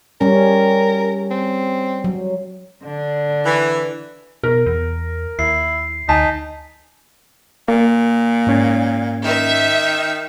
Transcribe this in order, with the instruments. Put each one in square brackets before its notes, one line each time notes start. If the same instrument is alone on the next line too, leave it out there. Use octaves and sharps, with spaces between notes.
[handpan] G3 C#4 [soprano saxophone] A#4
[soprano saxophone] C4
[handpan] F#3
[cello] D3 D4
[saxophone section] E3
[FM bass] B2 [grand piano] A#4
[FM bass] E2
[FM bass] D#2 [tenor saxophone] E4 [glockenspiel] C7
[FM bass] D2 [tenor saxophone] D#4 [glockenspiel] G#5 B6 [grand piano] A5
[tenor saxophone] A#2 [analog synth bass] A#3
[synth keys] G#2 C#4 G#6
[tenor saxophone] D#3 [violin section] E5